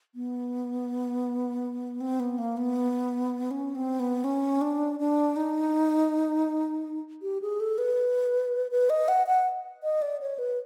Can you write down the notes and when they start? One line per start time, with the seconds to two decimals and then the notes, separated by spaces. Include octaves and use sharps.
0.15 B3
2.01 C4
2.20 B3
2.38 A#3
2.57 B3
3.51 C#4
3.75 C4
4.00 B3
4.24 C#4
4.61 D4
4.99 D4
5.36 D#4
7.22 G4
7.42 G#4
7.60 A4
7.78 B4
8.71 B4
8.90 D#5
9.08 F#5
9.27 F#5
9.83 D#5
10.02 D5
10.21 C#5
10.39 B4